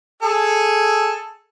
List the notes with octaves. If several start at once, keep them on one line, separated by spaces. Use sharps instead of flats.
G#4 A4